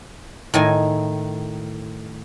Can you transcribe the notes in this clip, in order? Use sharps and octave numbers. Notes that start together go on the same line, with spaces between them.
A2 D#3 G#5